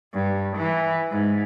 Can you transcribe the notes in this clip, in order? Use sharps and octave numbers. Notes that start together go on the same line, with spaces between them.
G2
E3
G#2